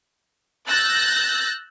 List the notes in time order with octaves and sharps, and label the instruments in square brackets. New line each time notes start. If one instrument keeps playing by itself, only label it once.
[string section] E6 F#6 G6 A6 A#6